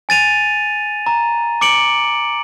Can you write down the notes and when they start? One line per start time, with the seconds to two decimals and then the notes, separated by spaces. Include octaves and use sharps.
0.09 G#5 A6 D#7 F7
1.06 A#5
1.61 D6 C#7 D7 F#7